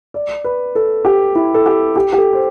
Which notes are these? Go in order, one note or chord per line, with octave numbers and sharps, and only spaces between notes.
D5
B4
A4
G4
E4
A4
G4
G4
G4
A4
C5